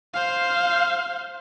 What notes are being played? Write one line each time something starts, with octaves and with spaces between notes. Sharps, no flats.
C5 F5